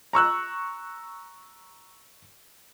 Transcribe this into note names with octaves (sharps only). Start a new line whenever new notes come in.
A#5 C#6 E6 F#6